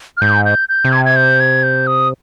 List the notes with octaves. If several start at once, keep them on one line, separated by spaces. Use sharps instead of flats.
F6
G#2 G6
G6
G6
C3
G#6
G#6
G6
G#6
G6
D#6